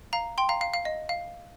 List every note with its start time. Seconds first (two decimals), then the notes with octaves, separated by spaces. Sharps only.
0.13 F5 A#5
0.38 G5 C6
0.49 F5 A#5
0.61 F5
0.74 F5
0.85 D#5
1.09 F5